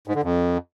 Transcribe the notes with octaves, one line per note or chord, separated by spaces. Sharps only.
G#2
D3
F2